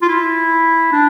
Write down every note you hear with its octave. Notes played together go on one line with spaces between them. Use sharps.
F4
E4
D4